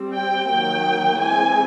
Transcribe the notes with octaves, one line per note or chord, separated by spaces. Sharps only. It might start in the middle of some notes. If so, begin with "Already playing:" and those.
Already playing: G3 C4
G5
D#3 F#3 A#3 G5
E3 G#3 C4 G#5